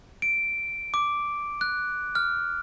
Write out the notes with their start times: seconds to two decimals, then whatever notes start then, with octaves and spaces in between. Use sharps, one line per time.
0.22 D7
0.94 D6
1.61 F#6
2.15 F6